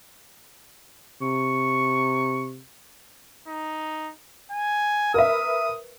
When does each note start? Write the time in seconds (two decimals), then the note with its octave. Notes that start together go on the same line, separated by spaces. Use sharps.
1.22 C3 C#6
3.48 D#4
4.51 G#5
5.14 A#4 B4 E5 D#6